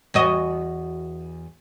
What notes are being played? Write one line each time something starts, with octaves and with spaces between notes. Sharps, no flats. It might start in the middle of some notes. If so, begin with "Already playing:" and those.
E2 F#4 D#5